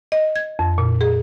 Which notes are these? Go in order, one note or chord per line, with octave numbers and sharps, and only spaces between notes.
D#5
G#6
F2
A#2
G#4